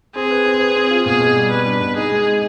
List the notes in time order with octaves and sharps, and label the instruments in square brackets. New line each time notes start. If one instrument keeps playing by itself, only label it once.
[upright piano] C4 [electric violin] G#4
[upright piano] B4
C4
B4
C4
F4
[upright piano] B2 [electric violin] G#4
[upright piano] B2
G3
[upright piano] G3 [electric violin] B4
[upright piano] D4
B2
[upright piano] D#4 [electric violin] G#4
[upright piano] G#3
G#3